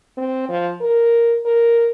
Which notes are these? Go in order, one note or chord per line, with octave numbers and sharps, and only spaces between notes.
C4
F3
A#4
A#4